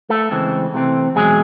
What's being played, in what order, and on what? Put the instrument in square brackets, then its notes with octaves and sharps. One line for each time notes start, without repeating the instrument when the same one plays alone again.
[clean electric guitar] A3 A4
C#3 E3 G#3 C4
C3 E3 A3 C4
E2 B2 F#3 G#3 G#4